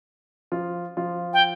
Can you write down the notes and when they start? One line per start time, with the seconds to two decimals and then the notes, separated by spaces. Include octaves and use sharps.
0.52 F3 F4
0.97 F3 F4
1.34 G5